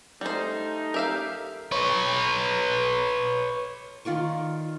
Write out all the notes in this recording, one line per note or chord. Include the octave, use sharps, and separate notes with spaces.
G3 A3 D#4 C5
G4 A#4 E5 F5
B4 C#5
D#3 F4 D5 C#6